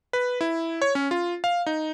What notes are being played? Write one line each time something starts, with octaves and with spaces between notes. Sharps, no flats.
B4
E4
C#5
C#4
F4
F5
D#4